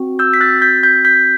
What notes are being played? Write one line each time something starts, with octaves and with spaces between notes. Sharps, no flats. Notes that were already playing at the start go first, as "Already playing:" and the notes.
Already playing: C4 F#4
E6 G6
B6
F#6 A6
G6 B6
G6 B6
G6 B6